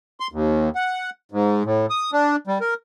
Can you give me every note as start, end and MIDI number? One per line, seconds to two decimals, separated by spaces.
0.20 0.27 84
0.32 0.69 39
0.75 1.10 78
1.32 1.63 44
1.65 1.86 45
1.90 2.11 87
2.13 2.36 62
2.47 2.58 55
2.61 2.74 70